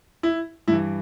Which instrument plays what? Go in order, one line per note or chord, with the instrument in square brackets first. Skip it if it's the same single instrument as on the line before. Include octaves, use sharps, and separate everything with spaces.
[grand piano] E4
G2 E3 E4